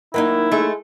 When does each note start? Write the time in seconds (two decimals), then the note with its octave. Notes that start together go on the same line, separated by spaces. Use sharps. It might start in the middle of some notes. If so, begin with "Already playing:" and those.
0.14 D#3 F#3 A#3 D#4 E4
0.52 G#3 A3